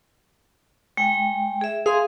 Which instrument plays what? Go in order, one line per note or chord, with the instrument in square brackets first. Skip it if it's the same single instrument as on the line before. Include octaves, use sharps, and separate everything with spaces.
[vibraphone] G#3 G5
G#4 E5
[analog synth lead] G#4 [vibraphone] F5 C6